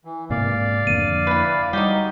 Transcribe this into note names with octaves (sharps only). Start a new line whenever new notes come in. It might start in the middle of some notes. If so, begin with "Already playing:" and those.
E3
G#2 C3 A#3 D5 F5
F2 D3 A#3 D#7
E3 B4
G3 D#4 F#4 G4